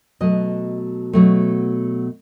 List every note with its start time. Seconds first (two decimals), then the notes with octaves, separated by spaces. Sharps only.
0.20 B2 F#3 A3 D#5
1.13 B2 F#3 A3